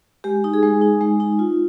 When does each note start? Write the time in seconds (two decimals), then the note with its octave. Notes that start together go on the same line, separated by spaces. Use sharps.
0.24 G#3 G4
0.44 D#4
0.54 G#4
0.63 G#3
0.82 D#4
1.01 G#3
1.20 D#4
1.39 F4